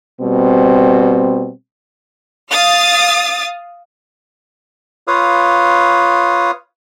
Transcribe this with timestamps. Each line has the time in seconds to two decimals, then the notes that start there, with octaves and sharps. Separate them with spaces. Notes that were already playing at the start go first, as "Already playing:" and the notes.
0.21 B2 G3 C4
2.51 F5 D#6 A6
5.08 F4 B4 C#5 F5 D#6